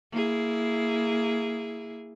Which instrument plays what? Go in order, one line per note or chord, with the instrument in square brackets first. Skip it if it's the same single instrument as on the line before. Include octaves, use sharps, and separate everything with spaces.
[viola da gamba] A#3 E4 G#4